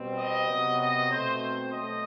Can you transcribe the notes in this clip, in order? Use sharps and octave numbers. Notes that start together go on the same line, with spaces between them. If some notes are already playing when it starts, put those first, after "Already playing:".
Already playing: B2 G3 C4
D#5
C3 F#3 B3
D#5
B2 A3 C4 C5
C5
B2 F#3 A3 D#5